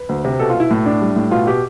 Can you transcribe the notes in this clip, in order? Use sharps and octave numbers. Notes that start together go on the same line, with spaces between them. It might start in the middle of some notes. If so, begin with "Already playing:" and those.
Already playing: B4
D2
C3
B2 A4
F4
B2
E4
A2
D4
G3
A2
B2 F4
B2 G4